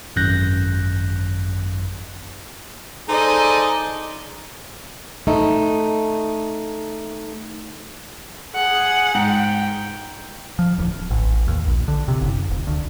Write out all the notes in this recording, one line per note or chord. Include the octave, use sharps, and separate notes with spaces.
G#1 F#2 F#6 G6 A#6
D#4 G#4 A4 C5 D5 D#5
A3 D#4
G#4 F#5
G#2 G5
F3
D1
A1
D#2
A#1
D3
C3
F#1
D#1
D2